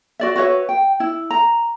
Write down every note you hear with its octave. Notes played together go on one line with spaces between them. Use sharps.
F#4 D5 E5
F#4 B4 C#5 E5
G5
E4
A#5